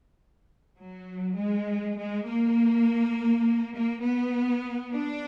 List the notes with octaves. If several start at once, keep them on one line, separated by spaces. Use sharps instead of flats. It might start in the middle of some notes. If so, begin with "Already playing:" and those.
F#3
G#3
G#3
A#3
A#3
B3
D4